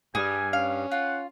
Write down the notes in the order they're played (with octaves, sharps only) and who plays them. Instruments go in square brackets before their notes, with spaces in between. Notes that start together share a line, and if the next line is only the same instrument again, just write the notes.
[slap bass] G2 [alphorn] G3 [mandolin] G#4 [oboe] G#5
[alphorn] C#4 [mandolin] F5
[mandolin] F4 [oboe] F#5